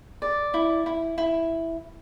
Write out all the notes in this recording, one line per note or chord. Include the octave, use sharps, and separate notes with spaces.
D5
E4
E4
E4